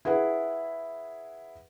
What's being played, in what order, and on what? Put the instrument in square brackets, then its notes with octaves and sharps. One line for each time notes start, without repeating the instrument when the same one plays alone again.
[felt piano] E4 G#4 B4 F#5